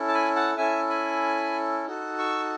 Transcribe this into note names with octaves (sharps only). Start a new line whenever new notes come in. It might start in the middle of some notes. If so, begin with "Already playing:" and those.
Already playing: C#4 E4 A4
A5
G#5 B5
F#5 A5
C#4 E4 A4 E5 G#5
G#5 B5
D#4 F#4 A4
C#6 E6